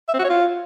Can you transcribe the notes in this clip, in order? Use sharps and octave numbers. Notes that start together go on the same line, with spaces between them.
E5
C4
F#4
C#5
F4